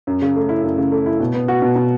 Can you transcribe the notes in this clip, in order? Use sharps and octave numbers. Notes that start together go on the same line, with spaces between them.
F#2
C#3
A3
E4
F#2
C#3
A3
E4
B2
B3
F#4
B2
B2